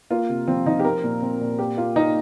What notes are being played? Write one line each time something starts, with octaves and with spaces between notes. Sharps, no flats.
A#3 F4
C3
F3 C4
F3 D#4
G4
C4 A#4
A#2
C4
A#2
A#3 G4
A#3 F4
A#3 D#4